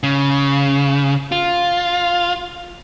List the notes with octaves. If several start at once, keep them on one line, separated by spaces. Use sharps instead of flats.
C#3
F4